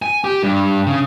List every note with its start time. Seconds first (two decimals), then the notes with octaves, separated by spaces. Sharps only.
0.02 G#5
0.24 G4
0.43 G2
0.87 C#3